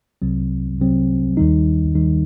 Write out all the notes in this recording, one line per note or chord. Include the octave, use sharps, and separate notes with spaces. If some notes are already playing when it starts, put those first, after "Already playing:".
C2 C3 F#3 C4
C2 C3 F#3 C4
D#2 D#3 G3 D#4
D#2 D#3 G3 D#4